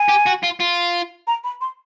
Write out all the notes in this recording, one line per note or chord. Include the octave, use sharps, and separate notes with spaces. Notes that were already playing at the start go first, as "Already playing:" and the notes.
Already playing: G#5
G4
F#4
F4
F4
A#5
B5
C6